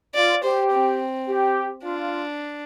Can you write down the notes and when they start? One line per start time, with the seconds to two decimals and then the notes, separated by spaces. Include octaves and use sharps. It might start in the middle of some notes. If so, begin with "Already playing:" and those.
0.15 F4 D5
0.43 G4 C5
0.71 C4
1.27 G4
1.83 D4 F4